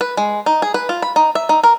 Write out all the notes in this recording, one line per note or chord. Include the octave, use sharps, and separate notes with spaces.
B4
G#3
D#4
G#4
B4
F4
B5
D#4
E5
D#4
A#4